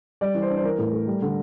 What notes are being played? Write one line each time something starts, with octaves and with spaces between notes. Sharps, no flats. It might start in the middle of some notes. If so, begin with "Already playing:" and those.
G3 D5
E3
C5
D4
C5
E3 A#4
A2
A3
G3
D3